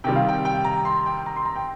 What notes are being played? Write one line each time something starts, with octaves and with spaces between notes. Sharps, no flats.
C3 D#3 G3 G5
F5
G5
G5
A#5
C6
G5
A#5
C6
A#5
G5